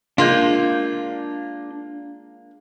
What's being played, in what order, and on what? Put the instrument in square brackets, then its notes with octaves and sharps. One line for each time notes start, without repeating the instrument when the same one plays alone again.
[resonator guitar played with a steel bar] G#3 A#3 F4 [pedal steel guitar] D4 G6